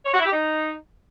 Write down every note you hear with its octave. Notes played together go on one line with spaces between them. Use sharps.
C#5
F#4
E4
G4
D#4